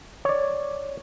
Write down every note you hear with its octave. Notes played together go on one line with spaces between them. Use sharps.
C#5 D5